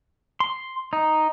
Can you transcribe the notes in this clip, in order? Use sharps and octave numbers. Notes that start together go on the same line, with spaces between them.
C6
D#4